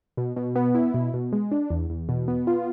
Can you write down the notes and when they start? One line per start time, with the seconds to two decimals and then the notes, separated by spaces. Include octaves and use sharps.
0.17 B2
0.37 B2
0.56 B3
0.75 E4
0.94 B2
1.14 B2
1.33 G#3
1.51 D4
1.70 E2
1.90 E2
2.09 B2
2.28 B3
2.47 F4